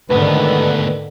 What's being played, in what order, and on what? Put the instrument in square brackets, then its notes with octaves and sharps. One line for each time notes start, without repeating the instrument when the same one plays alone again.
[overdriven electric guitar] D2 B3 [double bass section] G#2 D3 D#3 [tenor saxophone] B4